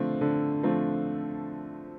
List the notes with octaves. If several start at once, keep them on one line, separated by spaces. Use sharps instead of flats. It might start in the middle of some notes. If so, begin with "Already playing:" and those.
Already playing: D3 F3 A3 C4
D3
F3 A3 C4